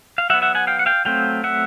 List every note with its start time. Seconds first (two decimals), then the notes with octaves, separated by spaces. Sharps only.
0.18 F5
0.30 F#3 E5 F#5
0.34 B3
0.42 E5 F#5
0.55 F#5 G#5
0.67 F5 G5
0.79 F#5
0.86 F5 G5
1.05 F#3 A3 C4 F5 G5
1.44 E5 F#5